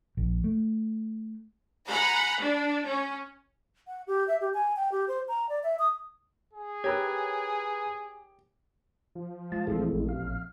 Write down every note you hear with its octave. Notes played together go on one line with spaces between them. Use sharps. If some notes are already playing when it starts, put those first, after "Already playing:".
A#1
A3
F#5 G#5 A#5 B5
D4
C#4
F#5
G4
E5
G4
G#5
G5
G4
C5
A#5
D5
E5
D#6
G#4
D#4 G4 A#4 B4 C#5 A#5 G#6
F3
G#3 F4 A5
A#1 C#3 E3 G#3 A3 C4
A1
F5